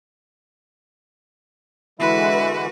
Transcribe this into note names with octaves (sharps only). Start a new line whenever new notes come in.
D3 E3 G#3 E4 F#4 B4